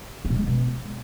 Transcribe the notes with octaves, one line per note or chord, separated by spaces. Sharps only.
B3
A#2
G#3
C#3
B2